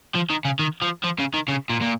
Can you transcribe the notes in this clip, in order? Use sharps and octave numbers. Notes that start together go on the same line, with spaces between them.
F3
D#3
C#3
D#3
F3
F3
C#3
D#3
C#3
A#2
A#2